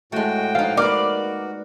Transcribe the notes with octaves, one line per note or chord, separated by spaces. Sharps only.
A2 G#3 A3 F#4 G5
F3 D#4 F5
A#3 D#4 F#4 B4 D5 D6 F6